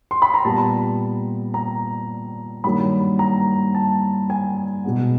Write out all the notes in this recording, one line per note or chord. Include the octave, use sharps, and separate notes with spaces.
C6
B5
A#5
A#2 G3 B3 A5
A#5
G2 D#3 F#3 A#3 B5
A#5
A5
G#5
B2 G#3 B3